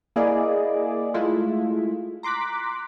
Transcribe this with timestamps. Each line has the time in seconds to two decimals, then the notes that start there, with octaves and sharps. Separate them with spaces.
0.16 A#3 E4 G#4 D5 D#5
1.14 G#3 A3 E4 F4
2.23 A#5 C6 D6 F#6 B6